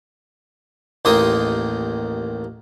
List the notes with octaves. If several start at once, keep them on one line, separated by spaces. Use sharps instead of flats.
A1 D#2 A#3 D#4 C5 D#6